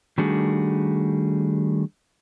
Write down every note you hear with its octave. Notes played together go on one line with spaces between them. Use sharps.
D#3 G3 A3 D4 F#4 G#4